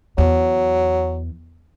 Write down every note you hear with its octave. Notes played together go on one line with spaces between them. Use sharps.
E2 F#3